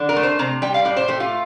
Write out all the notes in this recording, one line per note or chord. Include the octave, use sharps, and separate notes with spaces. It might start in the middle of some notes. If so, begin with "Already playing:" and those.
Already playing: D3
A#4
A3
C5
C3 A#5
G3 G5
F5
A2 D5
C5
A3 G4
F4